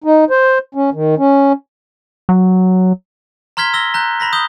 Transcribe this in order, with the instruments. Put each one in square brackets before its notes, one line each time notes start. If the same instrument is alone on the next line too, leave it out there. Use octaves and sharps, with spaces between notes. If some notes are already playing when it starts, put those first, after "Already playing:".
[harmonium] D#4
C5
C#4
D#3
C#4
[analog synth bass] F#3
[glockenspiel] A#5 C6 F6 G#6 B6 G7
E6 A#6 G7
A#5 F#6 G6
A#5 B5 A#6 B6
D#6 G6 G7